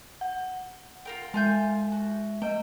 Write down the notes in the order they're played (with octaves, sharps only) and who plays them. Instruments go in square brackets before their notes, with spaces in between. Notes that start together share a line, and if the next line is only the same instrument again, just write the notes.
[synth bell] F#5
[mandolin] F4 A#4 G5
[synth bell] G#3 E5 [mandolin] F4 G#5 G6
[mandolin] F#4
[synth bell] A3 D#5 [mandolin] G5